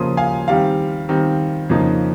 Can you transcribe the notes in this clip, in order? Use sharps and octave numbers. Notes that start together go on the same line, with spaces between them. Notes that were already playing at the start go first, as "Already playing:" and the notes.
Already playing: C#3 F3 A#3 C6 D#6
F5 G#5
D#3 G3 C4 F5
D#3 G3 C4
F2 C#3 F3 A#3 D#4